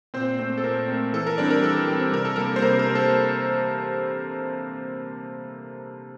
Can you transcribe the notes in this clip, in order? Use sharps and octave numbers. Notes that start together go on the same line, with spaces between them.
A#2 C4 C5
A3 C4
A4
A#2 A#4
A3 C4
E3 A4
A#4
G3 C4 D4 D5
A#4
E3 A4
G3 C4
C3 A#4
A4
G3 A#3 A#4
C5
C3 A#4
A#4
G3 A#3
A4